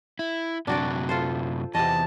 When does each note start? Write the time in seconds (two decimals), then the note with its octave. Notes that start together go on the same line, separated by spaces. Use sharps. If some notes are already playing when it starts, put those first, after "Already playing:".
0.19 E4
0.67 F#2 C3 F#3 D4 F#4 D5
1.09 F4 A4 C5
1.75 E2 C3 D#5 A5